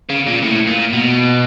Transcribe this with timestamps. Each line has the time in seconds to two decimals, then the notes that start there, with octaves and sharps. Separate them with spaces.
0.10 C#3
0.27 A#2
0.43 A2
0.67 A#2
0.93 B2